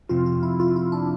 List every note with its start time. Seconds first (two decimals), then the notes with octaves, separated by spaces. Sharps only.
0.09 F2 C3 F4
0.26 F4
0.43 E4
0.60 F4
0.76 E4
0.92 D4